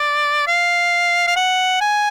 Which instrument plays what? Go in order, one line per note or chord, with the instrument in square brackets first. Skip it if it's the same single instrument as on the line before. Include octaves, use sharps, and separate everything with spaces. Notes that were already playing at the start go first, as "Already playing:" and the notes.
Already playing: [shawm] D5
F5
F5
F#5
G#5